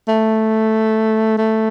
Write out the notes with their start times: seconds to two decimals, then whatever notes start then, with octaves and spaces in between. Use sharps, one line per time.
0.08 A3
1.38 A3